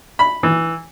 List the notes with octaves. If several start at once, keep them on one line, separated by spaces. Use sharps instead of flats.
B5
E3